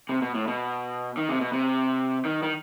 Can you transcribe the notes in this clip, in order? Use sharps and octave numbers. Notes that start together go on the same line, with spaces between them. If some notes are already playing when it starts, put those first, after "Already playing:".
C3
B2
A2
B2
D#3
C3
B2
C3
D#3
D#3